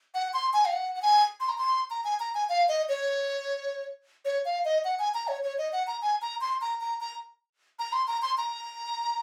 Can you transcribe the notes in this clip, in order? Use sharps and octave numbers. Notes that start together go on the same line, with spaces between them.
F#5
C6
G#5
F5
F#5
F#5
G#5
C6
A#5
C6
A#5
G#5
A#5
G#5
F5
D#5
C#5
C#5
F5
D#5
F#5
G#5
A#5
C#5
C#5
D#5
F#5
A#5
G#5
A#5
C6
A#5
A#5
A#5
A#5
C6
A#5
C6
A#5